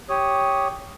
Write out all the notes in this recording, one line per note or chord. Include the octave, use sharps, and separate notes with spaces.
G4 C#5 D#6